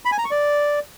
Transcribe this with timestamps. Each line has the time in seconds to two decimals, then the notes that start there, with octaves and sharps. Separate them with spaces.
0.05 B5
0.12 G#5
0.18 A#5
0.25 C#6
0.31 D5